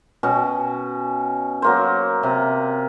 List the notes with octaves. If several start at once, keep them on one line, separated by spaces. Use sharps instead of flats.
B2 C#4 G5
F#3 A#3 C5
C3